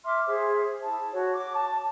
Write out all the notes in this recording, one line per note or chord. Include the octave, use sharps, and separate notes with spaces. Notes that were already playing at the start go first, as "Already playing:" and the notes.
E5 C6 D6 F6
G#4 C5 E5
E4 A5
F#4 C#5
D6
A5